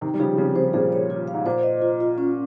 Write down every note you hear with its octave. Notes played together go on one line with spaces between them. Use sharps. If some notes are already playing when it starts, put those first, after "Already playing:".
C3 D#3 D#4
G3
C#3 F3 G4
C#3 F3 C4
C#3 F3 C5
A#2 C#3 G#4
C#5
F4
F5
G#2
A#2 C5
D#5
F4
F4
C#4